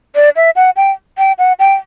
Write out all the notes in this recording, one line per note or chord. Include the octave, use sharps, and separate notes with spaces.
D5
E5
F#5
G5
G5
F#5
G5